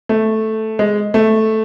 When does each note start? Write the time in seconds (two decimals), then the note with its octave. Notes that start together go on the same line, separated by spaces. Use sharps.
0.09 A3
0.79 G#3
1.14 A3